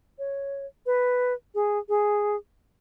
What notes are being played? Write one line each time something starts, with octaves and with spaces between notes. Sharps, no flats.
C#5
B4
G#4
G#4